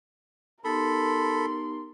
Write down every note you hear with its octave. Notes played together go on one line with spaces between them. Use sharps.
B3 D#4 G4 A4 A#4 B5 C6